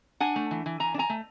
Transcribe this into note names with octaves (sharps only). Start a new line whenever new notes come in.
D4 F#5 G#5
A3
E3
E3
E3 G#5 A#5
D4
G#5 A#5
A3